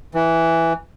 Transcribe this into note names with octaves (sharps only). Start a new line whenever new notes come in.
E3